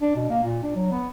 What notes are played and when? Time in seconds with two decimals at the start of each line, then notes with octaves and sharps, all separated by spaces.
0.02 D4
0.16 B2
0.30 A#3
0.44 A#2
0.63 D4
0.75 F#3
0.91 B3